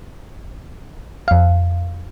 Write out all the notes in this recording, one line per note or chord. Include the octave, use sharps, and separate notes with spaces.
F2 F5